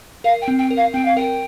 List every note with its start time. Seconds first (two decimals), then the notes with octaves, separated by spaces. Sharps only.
0.24 A#4 F5
0.42 G5
0.48 C4
0.59 G5
0.71 A#4
0.77 F5
0.94 C4 G5
1.05 F5
1.16 A#4 G5